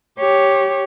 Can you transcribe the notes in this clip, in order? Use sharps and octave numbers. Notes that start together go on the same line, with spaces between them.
G4 C#5